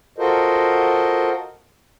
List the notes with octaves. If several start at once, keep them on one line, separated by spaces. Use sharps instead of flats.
F4 F#4 A4 A#4 C5 D#5